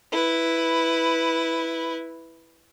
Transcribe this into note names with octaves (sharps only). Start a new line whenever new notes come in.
E4 B4